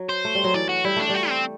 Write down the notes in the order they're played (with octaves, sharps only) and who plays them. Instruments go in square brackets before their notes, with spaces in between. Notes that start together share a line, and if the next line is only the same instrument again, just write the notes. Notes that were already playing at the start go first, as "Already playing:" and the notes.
Already playing: [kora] F#3
[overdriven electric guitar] C5
[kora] A3
G3
F#3
[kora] E3 [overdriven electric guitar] D5
[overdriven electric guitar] F#4
[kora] G3 [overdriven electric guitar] E4
[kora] A3 [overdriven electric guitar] D4
[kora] G3 [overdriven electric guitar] F#4
[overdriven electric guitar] C4